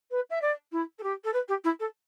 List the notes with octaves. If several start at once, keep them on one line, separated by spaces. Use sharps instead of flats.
B4
E5
D5
E4
A4
G4
A4
B4
G4
E4
A4